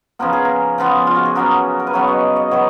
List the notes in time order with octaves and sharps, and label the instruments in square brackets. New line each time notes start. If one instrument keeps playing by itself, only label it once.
[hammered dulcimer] C#3 F3 B3 A#4
G#4
A#4
C#3 F3 B3
F4
F#4
G#4
C#3 F#3 B3 A#4
A#4
B4
C#3 F#3 B3 C#5
D#5
D#5
F#3 B3 C#5